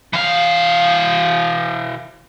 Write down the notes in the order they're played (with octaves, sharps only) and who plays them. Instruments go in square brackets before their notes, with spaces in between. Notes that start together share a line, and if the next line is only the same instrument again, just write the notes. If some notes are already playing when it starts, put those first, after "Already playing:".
[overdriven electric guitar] E3 F5